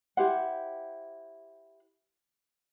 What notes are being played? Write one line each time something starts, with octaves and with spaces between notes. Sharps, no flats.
E4 G4 C5 F#5